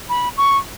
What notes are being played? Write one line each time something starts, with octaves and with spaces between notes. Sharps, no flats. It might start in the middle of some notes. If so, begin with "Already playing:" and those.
B5
C#6